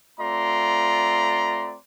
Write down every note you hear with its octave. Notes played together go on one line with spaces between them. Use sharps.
A3 C4 F4 D5 A#5 C6